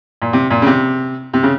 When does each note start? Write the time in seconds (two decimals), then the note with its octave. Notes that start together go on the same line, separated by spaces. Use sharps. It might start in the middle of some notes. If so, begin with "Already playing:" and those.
0.22 A#2
0.33 C3
0.50 A#2
0.62 C#3
0.67 C3
1.34 C3
1.43 C#3